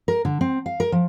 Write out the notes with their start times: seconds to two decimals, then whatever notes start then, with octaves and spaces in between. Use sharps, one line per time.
0.08 A#4
0.25 D3
0.41 C4
0.66 F5
0.80 A#4
0.92 F3